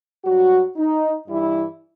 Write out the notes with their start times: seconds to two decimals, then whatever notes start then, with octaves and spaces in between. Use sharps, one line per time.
0.25 G2 F#3 F#4
0.76 D#4
1.28 G2 E3 G3 E4